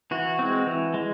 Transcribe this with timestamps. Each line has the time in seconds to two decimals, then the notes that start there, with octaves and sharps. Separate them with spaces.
0.11 E3 F#4
0.39 G#3 C4
0.67 E3
0.94 G#3